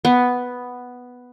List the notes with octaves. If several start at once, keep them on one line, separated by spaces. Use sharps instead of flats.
B3